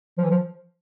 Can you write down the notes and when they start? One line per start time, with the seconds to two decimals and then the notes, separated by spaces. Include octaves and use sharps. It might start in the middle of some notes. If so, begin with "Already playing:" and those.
0.18 F3
0.24 E3
0.30 F3